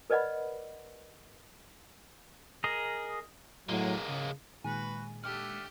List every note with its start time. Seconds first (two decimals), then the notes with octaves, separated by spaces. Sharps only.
0.10 A#4 B4 D5 D#5 F#5 B5
2.64 G#4 A#4 D#5
3.69 A2 F#3 G#3 A#3
4.07 C#3
4.64 A#2 D#3 G#3 F#4 B4 G#5
5.24 D3 A3 G4 F6